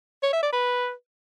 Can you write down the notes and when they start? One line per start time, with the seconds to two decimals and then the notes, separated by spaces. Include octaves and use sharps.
0.23 C#5
0.33 E5
0.43 D5
0.53 B4